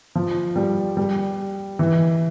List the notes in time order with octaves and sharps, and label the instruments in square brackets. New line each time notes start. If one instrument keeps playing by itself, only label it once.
[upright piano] F3
G3
G3
E3